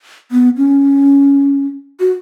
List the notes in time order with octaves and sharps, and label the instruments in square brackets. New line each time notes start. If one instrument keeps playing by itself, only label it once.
[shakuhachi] B3
C#4
F#4